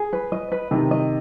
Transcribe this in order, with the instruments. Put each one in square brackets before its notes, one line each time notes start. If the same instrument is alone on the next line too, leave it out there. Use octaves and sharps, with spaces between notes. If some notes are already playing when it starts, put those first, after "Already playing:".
Already playing: [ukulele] G#4
B4
D#5
B4
[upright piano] C3 D#3 [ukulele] D#5
[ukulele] D#5